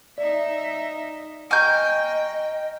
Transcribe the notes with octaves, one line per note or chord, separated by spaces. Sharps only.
D#4 D5 E5
D#5 G5 G#5 A#5 C#6 F6 G6